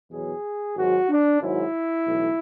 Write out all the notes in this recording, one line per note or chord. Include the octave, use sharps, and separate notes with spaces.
E2 B2 F#3 G#4
G#1 G#2 F#3 F#4
D4
G#1 G#2 F#3 E4
B1 A2 E3